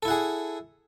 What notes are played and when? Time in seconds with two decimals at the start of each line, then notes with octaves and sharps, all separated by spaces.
0.03 A4
0.05 E4
0.08 F#5
0.11 G#4